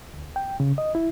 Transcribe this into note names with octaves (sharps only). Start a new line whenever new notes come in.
D2
G5
C#3
D#5
E4